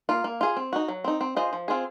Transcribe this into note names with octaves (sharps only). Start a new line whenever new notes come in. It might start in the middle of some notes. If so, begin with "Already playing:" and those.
A#3 F4
A#3
F4 G#4
C4
D#4 F#4
F#3
C4 D#4
C4
F4 G#4 C5 D#5
F3
C4 F4 G#4